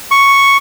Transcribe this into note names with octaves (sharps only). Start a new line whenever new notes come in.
C#6